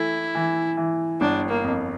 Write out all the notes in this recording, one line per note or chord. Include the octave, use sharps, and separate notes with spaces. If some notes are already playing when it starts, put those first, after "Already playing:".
Already playing: E3 A3 E4
E3
E3
G1 D4
A#3
F2